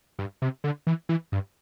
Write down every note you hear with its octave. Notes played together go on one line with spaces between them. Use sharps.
G2
C3
D3
E3
E3
G2